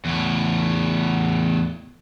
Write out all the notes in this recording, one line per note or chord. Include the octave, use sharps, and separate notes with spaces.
E2 A2